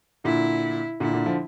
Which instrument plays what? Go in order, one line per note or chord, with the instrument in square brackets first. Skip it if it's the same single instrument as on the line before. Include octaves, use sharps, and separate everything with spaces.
[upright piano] A#2 D3 [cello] E4
[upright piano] A#2 D3 [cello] E4
[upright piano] A#2 D3
D3 F3